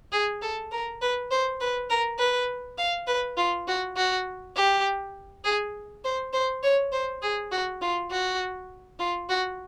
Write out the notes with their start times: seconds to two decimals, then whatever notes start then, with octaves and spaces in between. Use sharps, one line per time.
0.12 G#4
0.42 A4
0.71 A#4
1.01 B4
1.31 C5
1.61 B4
1.89 A#4
2.19 B4
2.78 F5
3.07 B4
3.37 F4
3.68 F#4
3.96 F#4
4.56 G4
5.44 G#4
6.04 C5
6.33 C5
6.63 C#5
6.92 C5
7.22 G#4
7.51 F#4
7.81 F4
8.11 F#4
8.99 F4
9.29 F#4